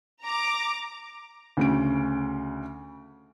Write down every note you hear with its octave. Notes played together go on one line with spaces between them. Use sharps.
A#5 D6
D2 C#3 D7